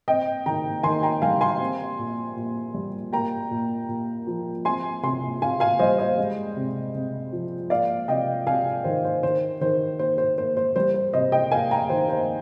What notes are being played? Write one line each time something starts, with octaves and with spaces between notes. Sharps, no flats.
C4 D#5 G5
D#3 G5 A#5
D#3 G#5 C6
G5 A#5
G3 F5 G#5
G#5 C6
C4
A#2
A#2
G3
A#3 G5 A#5
A#2
A#2
F3
C4 G#5 C6
C3 G#5 C6
C3 F5 G#5
F5 G#5
G3 C5 D#5
C5 D#5
G#3
C3
C3
F3
A#3 D5 F5
C3 D#5 G5
C3 F5 G#5
D#3 C5
C5
D#3 C5
D#3 C5
A#3 C5
C5
A#3 C5
C5
G3 C5
C5
C3 C5 D#5
D#5 G5
A#3 F5 G#5
G5 A#5
D#3 C5
C5